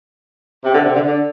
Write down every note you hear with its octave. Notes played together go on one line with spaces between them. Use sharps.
C3
D3
C3
D3
D3